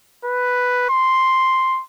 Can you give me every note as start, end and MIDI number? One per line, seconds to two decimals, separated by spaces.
0.25 0.88 71
0.90 1.82 84